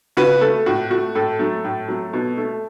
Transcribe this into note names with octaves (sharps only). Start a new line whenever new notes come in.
C#3 F#4 B4
A3 A4
A2 F#4
A3 F#4
A2 A4
F#3 A3
A2
F#3 A3
B2
A3